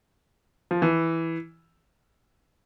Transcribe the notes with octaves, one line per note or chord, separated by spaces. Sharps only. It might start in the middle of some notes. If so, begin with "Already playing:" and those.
F3
E3